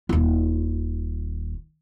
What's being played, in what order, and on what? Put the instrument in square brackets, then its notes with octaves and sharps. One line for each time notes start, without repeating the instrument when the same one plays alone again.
[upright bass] D#1 F4